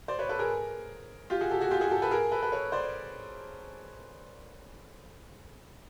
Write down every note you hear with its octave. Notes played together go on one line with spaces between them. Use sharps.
C5 D5
B4 C#5
A4 B4
G#4 A#4
F4 G4
F#4 G#4
G4 A4
F#4 G#4
F4 G4
F#4 G#4
G4 A4
A4 B4
G#4 A#4
A4 B4
A4 B4
B4 C#5
C5 D5